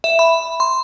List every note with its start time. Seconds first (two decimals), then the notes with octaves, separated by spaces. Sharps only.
0.04 E5
0.19 B5
0.60 C6